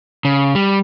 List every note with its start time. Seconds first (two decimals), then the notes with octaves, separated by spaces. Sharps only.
0.25 C#3
0.55 G3